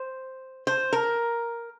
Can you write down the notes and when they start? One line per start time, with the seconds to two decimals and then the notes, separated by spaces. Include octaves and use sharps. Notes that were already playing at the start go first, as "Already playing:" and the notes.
Already playing: C5
0.67 C5
0.93 A#4